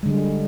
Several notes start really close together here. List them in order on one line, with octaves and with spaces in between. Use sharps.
G#3 D3 G3